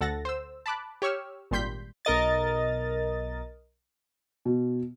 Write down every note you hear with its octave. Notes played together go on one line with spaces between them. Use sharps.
D2 A4 F#5 A6 A#6
C5 E6
A5 B5 D6 F#6
G4 C#5 C#6 E6 F6
G#1 A#2 G3 C6 G6 B6
B1 A#4 D#5 A6
B2